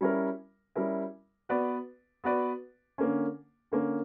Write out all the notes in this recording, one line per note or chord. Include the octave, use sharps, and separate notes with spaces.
G3 C#4 E4 A#4
G3 C#4 E4 A#4
B3 F#4 B4 D5
B3 F#4 B4 D5
D3 A#3 C#4
D3 A#3 C#4